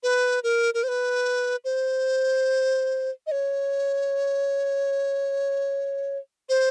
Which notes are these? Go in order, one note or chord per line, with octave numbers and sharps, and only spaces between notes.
B4
A#4
A#4
C5
B4
C5
D#5
C#5
C5